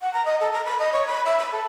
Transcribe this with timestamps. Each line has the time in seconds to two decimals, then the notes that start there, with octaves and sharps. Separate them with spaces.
0.01 F#5
0.13 A#5
0.25 D#5
0.41 A4
0.53 A#5
0.65 B5
0.79 D#5
0.93 C#5
1.07 B5
1.25 E5
1.39 B5
1.52 A4